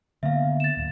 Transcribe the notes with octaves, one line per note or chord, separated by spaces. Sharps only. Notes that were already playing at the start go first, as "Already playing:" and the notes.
D3 A#3 B3 E5 F5
A6 E7
D1